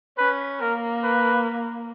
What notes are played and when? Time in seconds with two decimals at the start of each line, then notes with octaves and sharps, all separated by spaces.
0.18 C#4 B4
0.61 A#3 A#4
1.04 B4